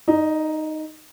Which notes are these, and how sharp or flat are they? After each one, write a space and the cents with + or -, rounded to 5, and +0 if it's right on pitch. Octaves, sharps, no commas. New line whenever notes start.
D#4 +0 D5 +35